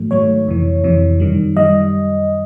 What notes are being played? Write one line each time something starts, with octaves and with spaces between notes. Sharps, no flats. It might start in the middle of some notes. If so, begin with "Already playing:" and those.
Already playing: G#2 D#3 F#3 A3
G#2 D#3 F#3 A3 C#5
F2 C3 E3
F2 C3 E3
F#2 D#3 G3
F#2 D#3 G3 D#5